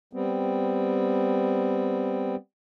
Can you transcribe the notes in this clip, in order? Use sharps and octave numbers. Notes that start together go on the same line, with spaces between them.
G3 B3 C4